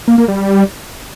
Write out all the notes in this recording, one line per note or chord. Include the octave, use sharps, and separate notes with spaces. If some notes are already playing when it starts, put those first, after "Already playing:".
A#3
A#3
G3